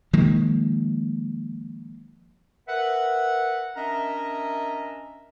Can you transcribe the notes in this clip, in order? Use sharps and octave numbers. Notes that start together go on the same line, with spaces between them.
D#3 F3 G#3 A#3
A#4 B4 E5 F#5
C#4 D4 A#4 D#5 E5 A#5